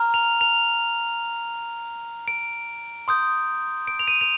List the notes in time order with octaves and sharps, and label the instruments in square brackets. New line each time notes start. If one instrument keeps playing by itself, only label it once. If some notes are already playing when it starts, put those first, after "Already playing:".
Already playing: [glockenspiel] A#5 F6
F7
F7
D7
C6 D#6 G6
D7
F7
D#7
F7